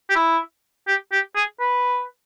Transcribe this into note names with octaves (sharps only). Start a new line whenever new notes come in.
G4
E4
G4
G4
G#4
B4